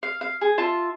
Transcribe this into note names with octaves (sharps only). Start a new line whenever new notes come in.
F5
F5
G#4
F4 E5 A5